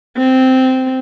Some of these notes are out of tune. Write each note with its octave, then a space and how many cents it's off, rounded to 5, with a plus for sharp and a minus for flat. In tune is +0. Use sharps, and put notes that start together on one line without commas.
C4 -10